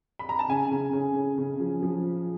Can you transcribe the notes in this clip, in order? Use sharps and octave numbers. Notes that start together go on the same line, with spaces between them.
B5
A#5
A5
C#3 G#5
C#3
C#3
C#3
C#3
F3
F3